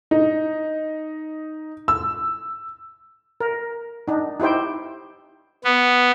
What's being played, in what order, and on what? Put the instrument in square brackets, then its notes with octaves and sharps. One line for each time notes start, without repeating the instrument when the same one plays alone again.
[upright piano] D#4
E6
[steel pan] A#4
D4 D#4
D#4 E4 G4 C5 G5
[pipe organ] B3